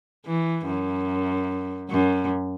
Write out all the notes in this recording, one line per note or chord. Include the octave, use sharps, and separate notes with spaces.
E3
F#2
F#2